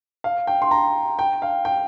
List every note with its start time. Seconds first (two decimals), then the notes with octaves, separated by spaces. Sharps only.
0.24 F5
0.47 G5
0.62 C6
0.71 A#5
1.19 G5
1.42 F5
1.65 G5